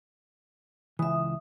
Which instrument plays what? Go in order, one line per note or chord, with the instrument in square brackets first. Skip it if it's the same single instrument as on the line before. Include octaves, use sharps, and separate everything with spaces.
[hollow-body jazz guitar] C#2 E3 [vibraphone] E5 D#6